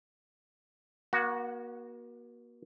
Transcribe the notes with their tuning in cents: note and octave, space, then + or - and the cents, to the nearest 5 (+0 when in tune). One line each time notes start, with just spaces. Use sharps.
A#3 +40 F#4 +0